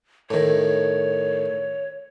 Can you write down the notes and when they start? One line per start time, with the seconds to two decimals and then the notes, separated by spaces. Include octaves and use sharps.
0.30 A2 D#3 C#5